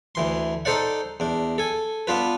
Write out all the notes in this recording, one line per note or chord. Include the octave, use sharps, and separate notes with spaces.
D2 E3 C6
D#4 A4 C5 D5 F#5
E2 D4
A4 G#5
B3 D4 F4 B4